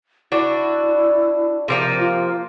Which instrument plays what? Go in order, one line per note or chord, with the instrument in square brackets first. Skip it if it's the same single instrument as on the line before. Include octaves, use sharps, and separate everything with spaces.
[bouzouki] D4 F#4 [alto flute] E4
[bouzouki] C3 F3 A#3
[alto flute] F4